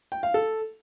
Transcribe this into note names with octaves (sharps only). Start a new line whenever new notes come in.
G5
F5
A4